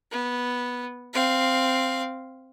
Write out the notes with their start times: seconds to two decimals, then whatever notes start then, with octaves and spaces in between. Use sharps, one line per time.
0.11 B3
1.14 C4 F5